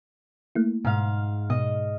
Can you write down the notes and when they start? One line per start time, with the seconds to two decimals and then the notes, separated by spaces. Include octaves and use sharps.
0.55 A3 A#3 E4
0.85 G#2 B2 F5
1.50 B2 D#5